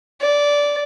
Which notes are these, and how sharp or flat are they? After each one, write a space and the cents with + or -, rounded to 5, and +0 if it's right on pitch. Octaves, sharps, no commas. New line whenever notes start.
D5 -15